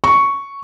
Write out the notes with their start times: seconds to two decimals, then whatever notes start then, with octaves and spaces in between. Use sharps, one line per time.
0.04 C#6